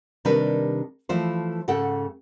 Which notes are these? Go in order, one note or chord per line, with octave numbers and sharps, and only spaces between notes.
C3 D#3 G3 D4 A#4 B4
E3 F3 A3 E4 F4 C5
G#2 C#3 A4 F#5 G5